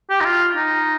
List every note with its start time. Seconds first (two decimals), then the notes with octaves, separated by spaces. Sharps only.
0.10 G4
0.21 D#4
0.25 F4
0.57 D#4